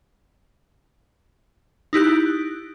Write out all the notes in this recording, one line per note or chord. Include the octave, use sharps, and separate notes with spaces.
D#4 E4 G4 F#6